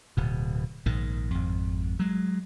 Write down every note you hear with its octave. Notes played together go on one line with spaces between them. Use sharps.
D1 B2
A#1 G#2 D#3
G#1 F2
F#3 G#3